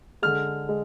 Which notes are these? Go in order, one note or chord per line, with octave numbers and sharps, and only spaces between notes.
D3 G#3 F6
G#3